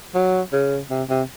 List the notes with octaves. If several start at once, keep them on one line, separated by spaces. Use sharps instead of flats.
F#3
C#3
C3
C3